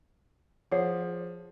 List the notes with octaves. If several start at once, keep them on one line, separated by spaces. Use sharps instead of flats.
F3 G#4 C#5 F#5